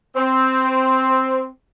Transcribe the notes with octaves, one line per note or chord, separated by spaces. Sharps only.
C4